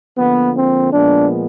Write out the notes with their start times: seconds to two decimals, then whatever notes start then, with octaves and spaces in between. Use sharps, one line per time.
0.17 D3 F3 A#3 B3
0.56 C4
0.93 A#2 F3 G#3 B3 D4